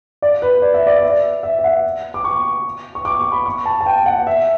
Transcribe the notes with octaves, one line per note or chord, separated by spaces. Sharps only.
D5
B4
D5
E5
D5
E5
D5
E5
E5
F#5
D6
C#6
C#6
D6
C#6
B5
C#6
A5
A5
G5
F#5
E5